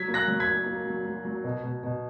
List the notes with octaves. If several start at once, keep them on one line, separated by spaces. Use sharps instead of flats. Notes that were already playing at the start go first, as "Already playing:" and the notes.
Already playing: F#3 G#6 B6
A#3
F#6 A#6
F#3
G#6 B6
A#3
A#3
F#3
F#3
F#3
B2
B2
B2